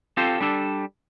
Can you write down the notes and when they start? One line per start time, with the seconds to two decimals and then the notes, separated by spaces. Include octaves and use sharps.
0.17 C4 F4 G4 A4 C5
0.41 G3 D4 A4